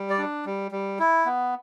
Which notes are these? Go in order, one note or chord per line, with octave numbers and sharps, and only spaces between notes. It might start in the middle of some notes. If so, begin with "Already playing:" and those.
Already playing: G3
D5
D4
G3
G3
E4
B3